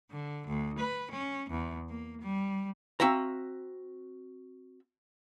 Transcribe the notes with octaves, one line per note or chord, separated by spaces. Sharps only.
D3
D2
B4
C#4
E2
A#3
G3
C4 F#4 E5 F5 A#5